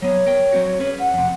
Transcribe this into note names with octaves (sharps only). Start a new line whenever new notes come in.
F#3 B3 C#5
A#4 G5
F#3 C4 F#4
C#4 G#4 B4
F#5
F2 C3